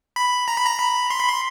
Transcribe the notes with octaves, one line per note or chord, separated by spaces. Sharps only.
B5
A#5
B5
A#5
B5
C6
B5
C6